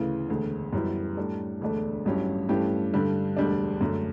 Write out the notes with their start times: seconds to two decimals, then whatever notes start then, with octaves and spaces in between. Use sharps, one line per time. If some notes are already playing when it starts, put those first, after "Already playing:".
Already playing: D2 C#3 E3
0.29 E1 D2 D3
0.73 F#2 E3 G3 B3 E4
1.17 A2 G3 D4 A4
1.61 E1 D2 D3 A3 D4
2.05 A1 G2 F#3 C#4 G4
2.49 G2 E3 A3 C#4 G4
2.94 G2 D3 G3
3.37 E1 D2 D3 G3 D4
3.81 F#2 D3 A3